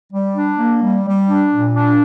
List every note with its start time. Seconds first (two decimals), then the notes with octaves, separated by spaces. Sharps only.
0.12 G3
0.36 D4
0.59 A#3
0.82 G3
1.06 G3
1.29 D4
1.52 A#2
1.76 D4